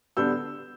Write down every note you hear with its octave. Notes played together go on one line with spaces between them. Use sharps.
D3 G3 B3 E6 G6